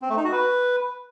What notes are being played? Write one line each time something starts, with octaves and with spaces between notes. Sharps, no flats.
C4
A3
D#4
F#4
B4